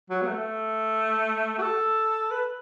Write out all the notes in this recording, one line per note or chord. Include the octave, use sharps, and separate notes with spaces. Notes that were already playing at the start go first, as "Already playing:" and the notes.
F#3
B3
A3
F#4
A4
B4